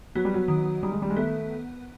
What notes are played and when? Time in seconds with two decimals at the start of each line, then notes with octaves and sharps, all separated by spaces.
0.15 F#3 B3
0.25 G3
0.34 F#3
0.48 D#3
0.83 D#3 G3
0.92 G#3
1.02 G3
1.10 G#3
1.16 A3 B3